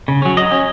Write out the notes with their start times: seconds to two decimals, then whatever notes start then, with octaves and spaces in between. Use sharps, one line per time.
0.08 C#3
0.22 F#3 C#4
0.37 F#3 D#5
0.52 C#4